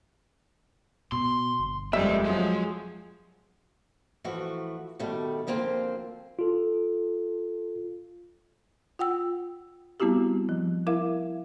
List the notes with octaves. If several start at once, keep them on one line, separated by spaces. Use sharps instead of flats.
B2 C6
G1
F2 G3 G#3 A#3 C4 E5
F3 F#3 G#3
E3 F3 A3 F#4
B2 D#3 G3 A3
D2 F3 A#3 C4 C5
F4 A4
F4 F#5 G5 E6
G3 B3 C4 E4 F#4 G4
F3
E4 A#4 E5 F5